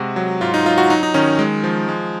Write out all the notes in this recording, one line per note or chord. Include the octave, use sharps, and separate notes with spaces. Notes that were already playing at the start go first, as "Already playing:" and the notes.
Already playing: C3 G#3 F#4
F#3
G#2 F4
D#4
F#3 F4
F#4
F#3 D#4
D#4
D#3 C#4
G#3
F3
G#3